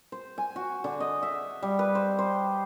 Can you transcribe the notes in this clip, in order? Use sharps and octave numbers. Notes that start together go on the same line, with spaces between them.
C5
G#5
F#4
D3
D#5
E5
G3
B4
C5
C5